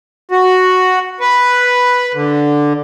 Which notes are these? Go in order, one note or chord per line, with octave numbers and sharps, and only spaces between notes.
F#4
B4
D3